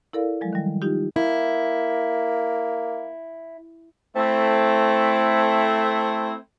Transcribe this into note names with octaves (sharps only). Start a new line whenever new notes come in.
E4 A4 A#4 D5 F5
F3 F#3 G#3
D#3 G3
D#4 F4 G4
A#3 E4
A3 C4 E4